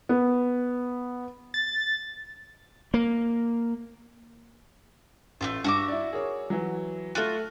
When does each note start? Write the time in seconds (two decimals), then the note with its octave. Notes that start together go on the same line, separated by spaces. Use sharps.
0.09 B3
1.54 A6
2.94 A#3
5.41 A1 A3 E4 F4
5.64 G2 F#4 E5 D6
5.88 E4 D5
6.13 G#4 A#4 C#5
6.50 E3 F#3
7.15 A3 F4 F#4 F6 F#6